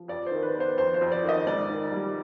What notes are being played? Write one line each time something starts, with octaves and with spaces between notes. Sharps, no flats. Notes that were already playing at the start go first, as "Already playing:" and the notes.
Already playing: F3
F2 D5
D#3 C5
B4
B3
C5
F2 C5
C5
F2
D5
D#3
D#5
G#2 D5
D#3
G3